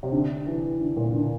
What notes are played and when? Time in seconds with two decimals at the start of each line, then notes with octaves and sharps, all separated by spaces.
0.03 C3
0.12 D3
0.47 E3
0.80 D3
0.97 A#2
1.14 D3